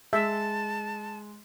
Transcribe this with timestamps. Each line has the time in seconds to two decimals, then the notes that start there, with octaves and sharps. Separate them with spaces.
0.13 G#3 E5 A5